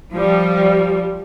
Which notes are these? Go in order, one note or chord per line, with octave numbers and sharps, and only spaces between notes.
F3 G3